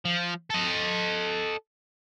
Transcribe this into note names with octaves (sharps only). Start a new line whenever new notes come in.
F3
A4 D#5